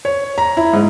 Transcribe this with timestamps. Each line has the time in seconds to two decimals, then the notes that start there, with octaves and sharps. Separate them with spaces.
0.05 C#5
0.38 A#5
0.57 E4
0.73 G#2